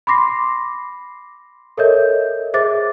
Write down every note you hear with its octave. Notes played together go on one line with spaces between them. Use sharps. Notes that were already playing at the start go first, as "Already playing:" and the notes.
B5 C6 D6 A#6 C7
A4 A#4 C#5 D#5 E5 G6
G#4 C5 E5 D6 A6